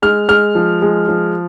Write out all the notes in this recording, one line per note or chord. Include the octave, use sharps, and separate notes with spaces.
G#3 F6
G#3 F6
F3
G#3
F3